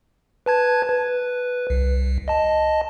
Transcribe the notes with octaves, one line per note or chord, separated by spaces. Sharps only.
B4 A5 G#6
B4
C2
D#5 A5